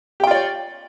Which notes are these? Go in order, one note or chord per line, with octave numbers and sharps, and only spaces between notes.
F4 G4 C#5 D5 G5